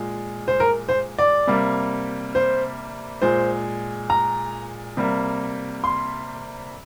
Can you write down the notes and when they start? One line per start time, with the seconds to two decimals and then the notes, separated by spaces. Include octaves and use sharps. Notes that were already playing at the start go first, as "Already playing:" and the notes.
Already playing: A#2 G#3
0.48 C5
0.60 A#4
0.89 C5
1.18 D5
1.47 C3 G3 A#3
2.35 C5
3.22 A#2 G#3 C5
4.10 A#5
4.97 C3 G3 A#3
5.84 C6